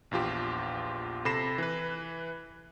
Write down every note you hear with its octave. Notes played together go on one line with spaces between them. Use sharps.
A#1 E2 F4 G4
C3 A4 B5 A#6 C7 E7
E3 B4